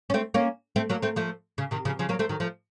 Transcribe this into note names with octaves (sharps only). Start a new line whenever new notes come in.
C#4
A3 C4
A#3 C#4
A3 C4
F#3 A#3
A3 C4
F3 A3
C#3
C3 D#3
C#3 F3
C#3 F3
F#3 A#3
A3 C4
D#3 F#3
F3 A3